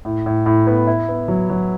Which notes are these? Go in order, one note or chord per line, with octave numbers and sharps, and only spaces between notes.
A2
A2
A2
B3
E4
B3
F#3
F#3